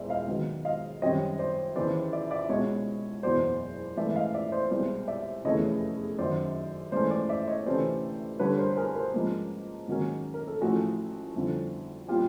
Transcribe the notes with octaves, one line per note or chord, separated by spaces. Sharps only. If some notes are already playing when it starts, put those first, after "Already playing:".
Already playing: E1 E2 C5 D5 E5
D#5 F5
G#2 D#3 F#3 B3
D#5 F5
F#2 D#3 G3 C4 C#5 D#5
C5 D5
D#2 C#3 E3 C5 D5
D5 E5
D5 E5
C#2 B2 G#3 C#5 D#5
F#1 E2 B2 F#3 C5 D5
G#2 E3 A3 C#4 D5 E5
D#5 F5
D5 E5
C5 D5
C2 B2 G#3 B3 C5 D5
D5 E5
F1 E2 C#3 E3 A3 C#5 D#5
F#2 D#3 F#3 C5 D5
G#2 E3 A3 C#4 C5 D5
C5 D5
D5 E5
C#5 D#5
D2 C3 E3 A3 C#4 C5 D5
G2 D3 G3 B4 C#5
A#4 C5
G#4 A#4
A#4 C5
G#2 F3 A#3 C#4
G#2 D#3 F#3 A#3 C#4
A#4
A4
A1 A2 F3 A3 F#4 G#4
G1 F2 D3 F3
A#2 G3 F4 G4